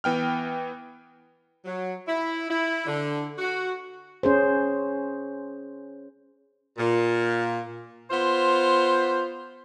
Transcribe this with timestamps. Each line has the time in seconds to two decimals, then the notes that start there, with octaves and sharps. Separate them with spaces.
0.04 E3 B3 G5 F6
1.65 F#3
2.07 E4
2.50 E4
2.86 D3
3.38 F#4
4.23 C#4 G#4 C5
6.78 A#2
8.11 B3 F4 C5